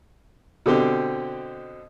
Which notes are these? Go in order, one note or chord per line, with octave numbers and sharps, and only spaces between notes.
B2 D3 C4 G4